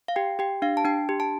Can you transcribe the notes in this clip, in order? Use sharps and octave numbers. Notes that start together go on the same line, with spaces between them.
F5
G4 G5
G4 G5
D4 F5
A5
D4 G5
G4
A5